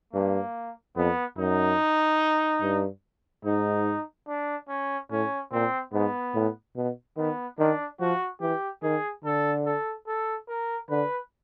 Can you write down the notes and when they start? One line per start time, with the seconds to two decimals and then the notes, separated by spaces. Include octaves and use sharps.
0.13 G2 A#3
0.96 F2 B3
1.38 F#2 D#4
2.61 G2
3.45 G#2 D#4
4.27 D4
4.68 C#4
5.11 A2 C#4
5.52 A#2 C4
5.93 G#2 B3
6.35 A2
6.76 B2
7.17 D#3 B3
7.59 D#3 D4
8.00 F3 F#4
8.41 E3 G4
8.82 D#3 G#4
9.24 D3 A4
9.65 A4
10.07 A4
10.48 A#4
10.90 D3 B4